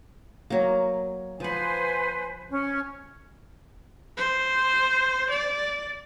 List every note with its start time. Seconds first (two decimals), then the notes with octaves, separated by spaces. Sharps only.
0.50 F#3 A#3
1.40 F3 B4 C5 F#5 G#5
2.50 C#4
4.17 C5
5.30 D5